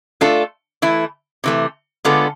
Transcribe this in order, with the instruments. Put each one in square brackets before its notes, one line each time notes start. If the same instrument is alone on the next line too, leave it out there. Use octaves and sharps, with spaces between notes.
[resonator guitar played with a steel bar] A3 D4 F4 A4
E3 A3 E4
C3 E3 A3
D3 G#3 B3 F4 A4